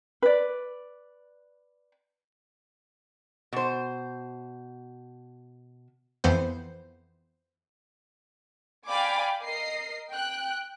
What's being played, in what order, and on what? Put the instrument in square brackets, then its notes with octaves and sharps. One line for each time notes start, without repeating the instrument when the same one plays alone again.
[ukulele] B4 D5
[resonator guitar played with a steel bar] B2 C5
[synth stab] F2 E3 B3 C5
[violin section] D5 F5 G5 G#5 B5 D6
A#4 D#5 C7
G5 F#6